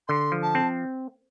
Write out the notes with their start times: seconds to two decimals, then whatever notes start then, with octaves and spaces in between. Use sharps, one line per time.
0.08 D3 C6
0.32 F3
0.42 A5
0.55 C4